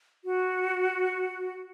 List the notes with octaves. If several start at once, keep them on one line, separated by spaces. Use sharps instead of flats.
F#4